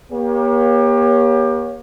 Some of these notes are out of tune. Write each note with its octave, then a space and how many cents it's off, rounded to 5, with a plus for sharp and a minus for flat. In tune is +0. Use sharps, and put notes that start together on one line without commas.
A#3 +40 G4 +25 C#5 +5